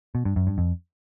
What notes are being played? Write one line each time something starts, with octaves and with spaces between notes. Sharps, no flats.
B2
G2
F#2
G2
F2